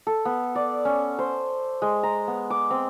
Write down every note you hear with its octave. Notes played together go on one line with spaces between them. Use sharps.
A4
B3
D5
C#4
C5
G#3
A#5
B3
D6
C4